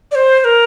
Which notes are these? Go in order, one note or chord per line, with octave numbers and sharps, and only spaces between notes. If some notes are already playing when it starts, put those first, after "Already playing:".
D5
C5
C5
A#4